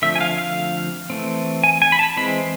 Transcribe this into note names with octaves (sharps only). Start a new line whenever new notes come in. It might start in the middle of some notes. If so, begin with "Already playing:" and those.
D3 F3 A3 C4 E5
G#5
F5
F5
E3 A3 C4
G#5
G#5
B5
A5
E3 G#3 C4 B5